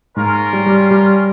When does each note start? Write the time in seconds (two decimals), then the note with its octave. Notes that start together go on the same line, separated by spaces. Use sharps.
0.16 G#2 A#3 C#4 F4 A#4
0.53 G3
0.66 G3
0.91 G3